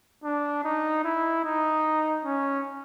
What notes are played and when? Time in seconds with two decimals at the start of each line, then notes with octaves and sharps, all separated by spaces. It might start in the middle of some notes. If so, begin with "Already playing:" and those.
0.23 D4
0.64 D#4
1.04 E4
1.44 D#4
2.25 C#4